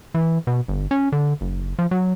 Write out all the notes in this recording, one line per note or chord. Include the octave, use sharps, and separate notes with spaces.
E3
B2
G1
C#4
D3
F#1
F3
F#3